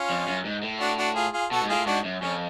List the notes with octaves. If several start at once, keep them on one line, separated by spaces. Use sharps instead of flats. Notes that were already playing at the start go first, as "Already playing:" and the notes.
Already playing: C#4 F4
F2
F#2
G#2
A2
D4 F#4
D4 F#4
F4 G#4
F4 G#4
B2 F#4 A4
G#2
A2 F4 G#4
G#2 D4 F#4
F#2
F2 C#4